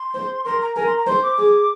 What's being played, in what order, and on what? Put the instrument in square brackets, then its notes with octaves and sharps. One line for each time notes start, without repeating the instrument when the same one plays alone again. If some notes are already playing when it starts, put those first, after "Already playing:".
Already playing: [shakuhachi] C6
[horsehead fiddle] C5
[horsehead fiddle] A#4 [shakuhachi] C6
[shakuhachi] A#5
[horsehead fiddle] A#4 [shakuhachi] G#5
[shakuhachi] C6
A#5
[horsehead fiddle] C5 [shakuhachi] C6
[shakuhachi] D6
[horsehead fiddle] G#4